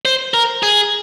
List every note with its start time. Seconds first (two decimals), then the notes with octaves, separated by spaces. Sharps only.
0.05 C5
0.34 A#4
0.63 G#4